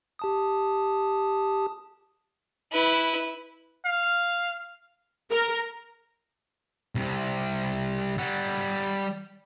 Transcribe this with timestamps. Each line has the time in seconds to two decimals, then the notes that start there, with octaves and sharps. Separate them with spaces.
0.19 G4 A5 D#6
2.72 E4 B4
3.85 F5
5.31 A#4
6.95 C2 C3
8.18 G3 F#5